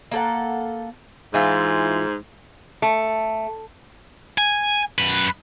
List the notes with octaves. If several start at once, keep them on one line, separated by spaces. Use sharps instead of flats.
A#3 A4 F#5
G#2 E3 F4
A3
G#5
F#2 B4